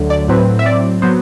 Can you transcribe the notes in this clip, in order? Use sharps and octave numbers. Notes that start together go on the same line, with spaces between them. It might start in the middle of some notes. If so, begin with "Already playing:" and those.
Already playing: D2 D3 F#3 A3
D5
A2 F#3 C4 B4
E5
D5
F#3 B3 C5